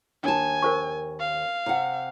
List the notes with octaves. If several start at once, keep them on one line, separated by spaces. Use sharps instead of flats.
D#2 D4 G#5 A5
A#4 C5 C#6
F5
C3 F#5